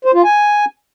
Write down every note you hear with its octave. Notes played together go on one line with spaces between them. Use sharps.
C5
F4
G#5